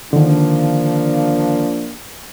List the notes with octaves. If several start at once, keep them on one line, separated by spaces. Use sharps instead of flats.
D3 D#3 F3 A#3 D4